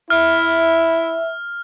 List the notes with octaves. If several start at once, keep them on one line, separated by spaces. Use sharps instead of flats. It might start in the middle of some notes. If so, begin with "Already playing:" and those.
E4 E5 F6